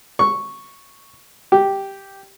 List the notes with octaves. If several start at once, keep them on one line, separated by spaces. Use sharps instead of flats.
C#6
G4